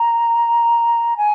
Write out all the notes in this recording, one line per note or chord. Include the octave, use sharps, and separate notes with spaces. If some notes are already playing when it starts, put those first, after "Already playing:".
Already playing: A#5
G#5